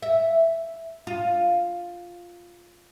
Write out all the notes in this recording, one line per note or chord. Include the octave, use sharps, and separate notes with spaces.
E5
F4